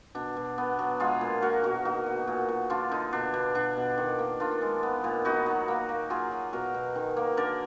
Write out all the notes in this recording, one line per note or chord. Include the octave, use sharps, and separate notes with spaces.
B2 D4
B2
B3
F#3
G#3 F4 G#4
A#2
A#3 F#4 A#4
B2 F#4 A#4
A#3 D#4 F#4
B2
A#2
A#2
D3 D4 F4
D3 D#4
B2 D4
B2
B2 D4
B2
D#3
A#3
D#3 D4 F4
G#3
B3
A#2
B3 D#4 F#4
F#3
A#3
A#3
F#3 F4 G#4
F#3
B2 F#4 A#4
B2
D#3
A#3
D3 A#4 D5